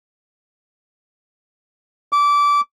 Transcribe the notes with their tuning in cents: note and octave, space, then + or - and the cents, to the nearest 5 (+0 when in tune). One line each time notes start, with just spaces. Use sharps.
D6 -20